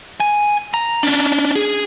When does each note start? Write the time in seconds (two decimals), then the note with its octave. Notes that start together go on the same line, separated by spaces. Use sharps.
0.20 G#5
0.74 A#5
1.03 C#4 D4
1.56 G#4